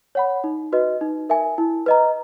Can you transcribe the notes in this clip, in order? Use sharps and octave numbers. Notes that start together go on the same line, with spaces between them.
C#5 F#5 B5
D#4
F#4 B4 D#5
D#4
A#4 E5 G#5
E4
B4 D#5 A#5